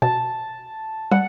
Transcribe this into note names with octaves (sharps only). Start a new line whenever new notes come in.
B2 A5
G3 F#5